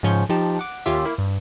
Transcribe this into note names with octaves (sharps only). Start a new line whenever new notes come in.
G#2 C#3 F3 C#4 C#6 G6
F3 D#4 G4 A5
F#5 D6
D#2 C#4 F4 G4 E5
A#3 E4
G2